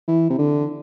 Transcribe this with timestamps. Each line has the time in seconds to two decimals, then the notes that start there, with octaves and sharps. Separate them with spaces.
0.08 E3
0.30 C3
0.38 D3